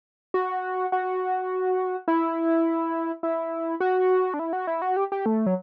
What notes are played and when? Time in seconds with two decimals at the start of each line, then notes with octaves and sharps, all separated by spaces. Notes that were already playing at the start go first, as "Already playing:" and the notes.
0.34 F#4
0.92 F#4
2.08 E4
3.23 E4
3.80 F#4
4.34 D4
4.39 E4
4.53 F#4
4.67 E4
4.82 F#4
4.96 G4
5.12 G4
5.26 A3
5.46 F#3